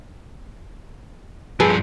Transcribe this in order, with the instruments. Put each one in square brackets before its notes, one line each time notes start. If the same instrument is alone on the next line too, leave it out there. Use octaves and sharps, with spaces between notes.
[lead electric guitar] G2 F3 [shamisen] G#4 A4 B4